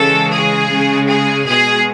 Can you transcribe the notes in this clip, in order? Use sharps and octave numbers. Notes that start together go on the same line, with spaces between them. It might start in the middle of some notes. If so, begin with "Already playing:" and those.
Already playing: C#3 E3 G#3 A4
G#4
C#3 G#3
G#4
B2 G#3 G#4